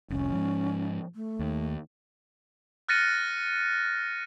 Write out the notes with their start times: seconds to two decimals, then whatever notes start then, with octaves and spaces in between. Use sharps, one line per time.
0.10 F1 C2 C#4
0.32 G#2 F3
1.15 A3
1.39 D#2
2.88 F6 F#6 A6 A#6 C#7 D#7